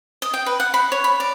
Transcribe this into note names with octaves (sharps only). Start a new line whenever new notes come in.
D#5
G5
B4
F#5
B5
C#5
B5
D5